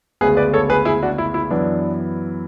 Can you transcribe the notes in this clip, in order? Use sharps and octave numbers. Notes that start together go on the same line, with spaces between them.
D2 C#3 G#3 B3 G#4 B4
B4 D5
A4 C#5
G#4 B4
E4 G#4
D4 F#4
E4
E4
F#2 E3 B3 D4